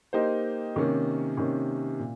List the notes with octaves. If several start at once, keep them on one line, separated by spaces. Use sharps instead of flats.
A#3 D#4 G4 C5
C3 D#3 A#3 C#4
C3 D#3 A#3 C#4
A#2